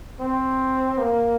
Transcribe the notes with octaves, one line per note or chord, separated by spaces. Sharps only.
C4
A#3